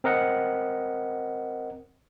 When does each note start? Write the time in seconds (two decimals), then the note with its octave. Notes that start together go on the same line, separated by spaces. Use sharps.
0.04 C4 A#4 D#5 F#5